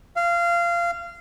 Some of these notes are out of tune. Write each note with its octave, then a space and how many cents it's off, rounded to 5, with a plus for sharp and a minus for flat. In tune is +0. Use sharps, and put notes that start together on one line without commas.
F5 -20